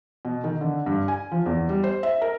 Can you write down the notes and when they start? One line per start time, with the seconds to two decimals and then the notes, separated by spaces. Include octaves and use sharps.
0.25 B2
0.44 D#3
0.61 D3
0.86 G2
1.08 G#5
1.32 F3
1.46 E2
1.69 G3
1.84 C5
2.03 E5
2.22 A#4